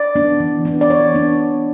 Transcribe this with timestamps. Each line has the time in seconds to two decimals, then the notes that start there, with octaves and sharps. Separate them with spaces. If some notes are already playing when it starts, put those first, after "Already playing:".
Already playing: D5
0.16 B3 D4
0.40 E3
0.65 B3 D4
0.81 D5
0.89 E3 C#5
1.14 B3 D4